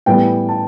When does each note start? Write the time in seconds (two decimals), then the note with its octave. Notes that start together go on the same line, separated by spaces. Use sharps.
0.06 A2 E3 G3 B3 G5
0.49 A5